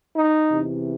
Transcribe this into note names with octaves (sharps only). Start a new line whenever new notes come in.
D#4
E2 C3 E3